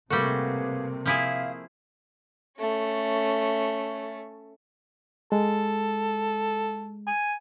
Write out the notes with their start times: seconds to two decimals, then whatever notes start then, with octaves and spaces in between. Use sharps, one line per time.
0.10 C3 G3 A3 A#3 F#4 G#4 B4 F5
1.06 F3 E4 G#4 E5 F5 D#6
2.59 A3 C#4
5.32 G#3 A4
7.07 G#5